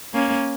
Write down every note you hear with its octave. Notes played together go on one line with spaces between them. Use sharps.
A#3 C#4